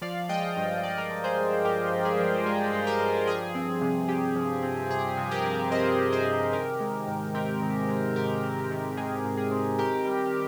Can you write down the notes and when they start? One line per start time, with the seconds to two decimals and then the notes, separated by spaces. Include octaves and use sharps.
0.01 F3 D5 F5
0.29 G#3 D#5 G5
0.57 G2
0.83 G2 D5
0.90 D#5
0.97 A#4 D5
1.10 F3
1.24 G#4 C5
1.38 G#3
1.65 G2 G4 A#4
1.92 G2
2.05 G#4
2.19 F3
2.46 G#3 G#4
2.73 G2
2.87 G4 A#4
3.00 G2
3.27 F3 G#4
3.55 C4
3.82 C3
4.08 C3 G4
4.36 F3
4.63 C4
4.90 C3 G#4
5.17 C3
5.31 G4 A#4
5.45 F3
5.72 C4 C5 D#5
5.98 C3
6.12 G#4 C5
6.26 C3
6.53 D#3 G4 A#4
6.80 G#3
7.07 G#2
7.34 C4 G4 A#4
7.62 D#3
7.89 G#3
8.16 G#2 G4 A#4
8.43 C4
8.71 D#3
8.97 G#3 G#4
9.24 G#2
9.37 G#4
9.51 C4
9.79 D#3 G4 A#4
10.05 G3